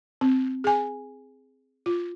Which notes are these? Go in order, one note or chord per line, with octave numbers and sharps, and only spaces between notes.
C4
G#4 G#5
F4